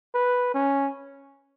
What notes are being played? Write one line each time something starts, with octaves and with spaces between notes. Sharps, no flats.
B4
C#4